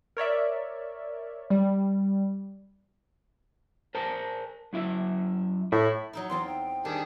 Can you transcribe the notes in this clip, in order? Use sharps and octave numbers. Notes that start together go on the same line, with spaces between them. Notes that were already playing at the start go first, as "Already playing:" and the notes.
A#4 C#5 D5 E5
G3
A#4 C5 A5
F#2 E4 E5
A2 E4
F#3 D#4 E4
E2 C4 F4 C6
G5
D#3 G3 D4 G#4